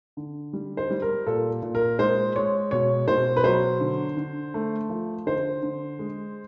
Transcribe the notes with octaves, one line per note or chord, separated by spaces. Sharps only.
D3
G3
C5
G3
A#4
A#2 A4
A#2
A#4
G#3 C5
G#3 C#5
B2 C#5
B2 C5
B4
F#3 C5
D3
D3
A3
F3
D3 C5
D3
G#3